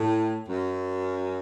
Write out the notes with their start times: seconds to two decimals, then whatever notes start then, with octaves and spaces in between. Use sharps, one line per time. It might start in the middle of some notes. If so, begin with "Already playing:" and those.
Already playing: A2
0.49 F#2